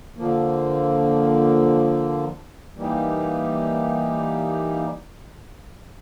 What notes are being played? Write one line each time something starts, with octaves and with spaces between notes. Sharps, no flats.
D3 F3 A#3
E3 G3 A#3 D#4 G4